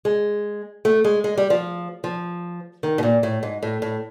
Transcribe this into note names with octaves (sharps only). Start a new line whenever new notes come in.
G#3
A3
G#3
G#3
G3
F3
F3
D#3
B2
A#2
A2
G#2
A2
A2